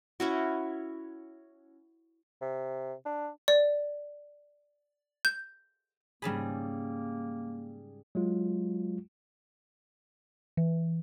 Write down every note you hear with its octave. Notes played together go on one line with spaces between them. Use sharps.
C#4 E4 F#4
C3
D4
D5
G6
G#2 C#3 G3 A#3 G#4 B5
F#3 G#3 F4
E3